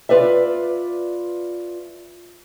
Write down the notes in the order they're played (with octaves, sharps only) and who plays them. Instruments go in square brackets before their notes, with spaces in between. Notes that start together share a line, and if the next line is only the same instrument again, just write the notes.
[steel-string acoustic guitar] F4 B4 D5 E5